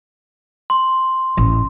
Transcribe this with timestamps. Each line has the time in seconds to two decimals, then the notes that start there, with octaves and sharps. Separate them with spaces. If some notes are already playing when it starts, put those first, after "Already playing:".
0.70 C6
1.37 A1